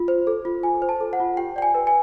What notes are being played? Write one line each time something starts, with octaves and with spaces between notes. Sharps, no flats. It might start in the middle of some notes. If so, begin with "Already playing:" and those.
Already playing: F4
C5
A4
F4
F4 G#5
C5
A5
A4
F#5
F4
G4 G5
D5 G5
G#5
B4
G#5